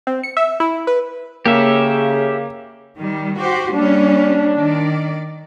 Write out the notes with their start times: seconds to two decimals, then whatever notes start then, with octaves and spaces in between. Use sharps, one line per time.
0.07 C4
0.23 C#7
0.37 E5
0.60 E4
0.87 B4
1.46 C#3 A#3 G4 A4 E5
2.99 D#3 G3
3.38 F#4 G4 C5
3.73 G3 A#3 C#4 D4
4.56 D#3 D5